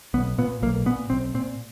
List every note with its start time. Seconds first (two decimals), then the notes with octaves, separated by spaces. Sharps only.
0.14 B1 B3
0.38 A#2 B3
0.62 B1 A#3
0.86 A#2 B3
1.10 B1 C4
1.34 A#2 C4